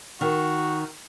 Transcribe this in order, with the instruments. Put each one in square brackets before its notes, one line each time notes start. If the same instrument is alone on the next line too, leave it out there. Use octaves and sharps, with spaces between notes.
[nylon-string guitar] D#3 [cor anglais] F#4